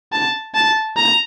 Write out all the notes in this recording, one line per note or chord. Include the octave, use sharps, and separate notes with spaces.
A5
A5
A#5